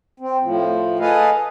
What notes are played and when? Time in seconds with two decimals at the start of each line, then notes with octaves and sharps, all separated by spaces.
0.20 C4
0.41 A2 F3
0.99 G#4 A4 B4 D#5 F5